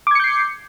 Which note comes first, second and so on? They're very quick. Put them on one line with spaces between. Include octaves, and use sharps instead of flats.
D6 G#6 C#7 G6 C7